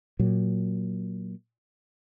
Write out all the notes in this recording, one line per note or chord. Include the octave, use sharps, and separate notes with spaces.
A#2 F#3